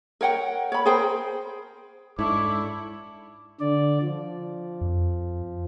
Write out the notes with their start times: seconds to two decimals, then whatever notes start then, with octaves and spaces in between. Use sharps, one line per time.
0.21 A#4 C#5 F#5 G5
0.72 C#5 B5
0.86 G#4 A#4 C5 G5
2.19 G#2 D4 E4 A4 C#5 D6
3.60 D3 D5
4.02 F3
4.81 F2